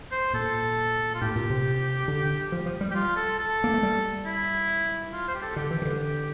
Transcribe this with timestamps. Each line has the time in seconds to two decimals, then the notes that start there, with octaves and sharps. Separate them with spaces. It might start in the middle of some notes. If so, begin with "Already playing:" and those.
0.11 C5
0.33 A#2 A4
1.15 F4
1.22 A2 G4
1.36 A#2
1.50 C3
2.08 D3
2.52 F3
2.66 F3
2.81 G3
2.91 G4
2.95 F4
3.16 A4
3.38 A4
3.64 A#3
3.74 A3
3.83 G3
4.25 E4
5.13 F4
5.28 C5
5.35 G4
5.42 A4
5.56 D3 G4
5.71 E3
5.82 E3
5.85 D3